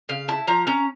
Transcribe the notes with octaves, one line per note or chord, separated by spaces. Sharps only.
C#3 F5
E4 A5
F3 A#5
C#4 A#5